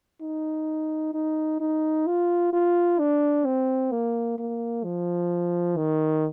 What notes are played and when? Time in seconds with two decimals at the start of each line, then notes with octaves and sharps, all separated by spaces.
0.22 D#4
1.14 D#4
1.61 D#4
2.07 F4
2.53 F4
2.99 D4
3.46 C4
3.92 A#3
4.39 A#3
4.84 F3
5.77 D#3